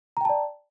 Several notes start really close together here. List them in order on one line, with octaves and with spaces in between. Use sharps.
A#5 G5 A5 D5